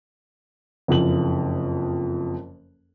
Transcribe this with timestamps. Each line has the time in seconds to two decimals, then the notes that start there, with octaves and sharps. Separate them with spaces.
0.88 F#1 F2 F#7